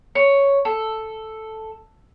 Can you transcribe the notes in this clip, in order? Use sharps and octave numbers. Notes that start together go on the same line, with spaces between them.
C#5
A4